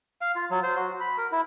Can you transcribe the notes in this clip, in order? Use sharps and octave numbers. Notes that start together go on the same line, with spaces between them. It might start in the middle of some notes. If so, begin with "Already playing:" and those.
F5
F4
F#3
C5
F#4
B5
A#4
E4